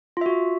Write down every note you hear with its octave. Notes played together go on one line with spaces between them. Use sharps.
F4 F#4 E5